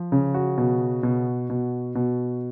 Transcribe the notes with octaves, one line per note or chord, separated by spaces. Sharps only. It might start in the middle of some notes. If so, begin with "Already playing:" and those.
Already playing: F3
C#3
F#4
B2
B2
B2
B2